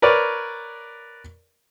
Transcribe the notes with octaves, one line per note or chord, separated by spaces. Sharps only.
A#4 B4 C#5 D5